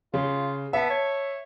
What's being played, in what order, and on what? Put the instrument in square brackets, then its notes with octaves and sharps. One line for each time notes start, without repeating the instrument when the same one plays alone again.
[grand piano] C#3 [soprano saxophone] F4
[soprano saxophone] B3 [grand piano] E5 A5
[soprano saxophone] C#5